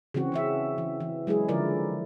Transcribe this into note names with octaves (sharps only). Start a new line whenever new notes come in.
C#3 E3 C4 F#4
E3 C#4 E5
E3
E3
F#3 G#3 E4 G#4
D3 F3 E4 A#4 D5